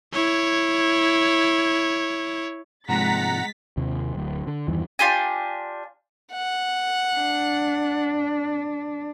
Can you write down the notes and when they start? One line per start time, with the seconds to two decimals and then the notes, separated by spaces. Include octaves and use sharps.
0.13 E4 C#5
2.89 G#2 C3 F3 G#3 F#5 A#5 A6 B6
3.77 D#2 C3
4.15 D1 A2
4.47 D3
4.68 E2 G2 D#3 E3
4.99 D4 F4 G4 G#5
6.33 F#5
7.16 D4